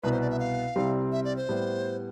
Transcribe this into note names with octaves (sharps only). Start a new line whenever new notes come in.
C2 B2 B3 B4
C5
D5
E5
F5
C2 C3 G3 C4
E5
D5
C5
A2 G3 B3